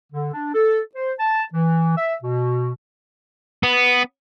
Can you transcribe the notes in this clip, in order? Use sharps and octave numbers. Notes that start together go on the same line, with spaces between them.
D3
D4
A4
C5
A5
E3
E5
B2
B3